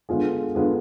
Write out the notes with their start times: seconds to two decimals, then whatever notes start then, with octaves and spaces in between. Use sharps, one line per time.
0.09 D3 G#3 B3 F4 G#4
0.55 D3 G#3 B3 F4 G#4